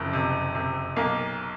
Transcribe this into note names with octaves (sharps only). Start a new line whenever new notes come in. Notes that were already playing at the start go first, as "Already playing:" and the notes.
Already playing: F#1 F2
C3
C3
B1 A#3